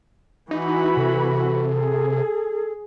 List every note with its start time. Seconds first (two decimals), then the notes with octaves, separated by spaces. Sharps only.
0.51 E3 D#4 F#4 B5
0.97 C3 A4
1.67 G#4